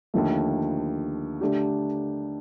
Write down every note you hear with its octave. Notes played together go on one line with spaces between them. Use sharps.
D#2 D3 F3 A3
D3 A3 D4 G4